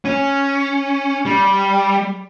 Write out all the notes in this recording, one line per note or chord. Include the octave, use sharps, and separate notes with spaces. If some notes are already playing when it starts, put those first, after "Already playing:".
C#4
G3